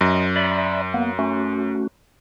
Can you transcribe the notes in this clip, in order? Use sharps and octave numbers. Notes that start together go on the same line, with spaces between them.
F#2 D#5
D5 E5 B5
A#3 B3
A3 C#4 F#4